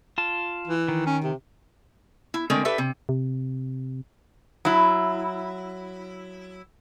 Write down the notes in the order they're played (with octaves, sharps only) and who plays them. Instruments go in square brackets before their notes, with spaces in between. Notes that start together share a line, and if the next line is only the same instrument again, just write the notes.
[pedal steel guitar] F4 A5
[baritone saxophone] E3
[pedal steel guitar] D#3
[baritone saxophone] C#4
C3
[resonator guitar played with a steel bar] E4
D3 G#3 A3 C4 A#4
G4 A4 B4 E5
C3
[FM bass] C3
[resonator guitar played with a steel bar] F#3 E4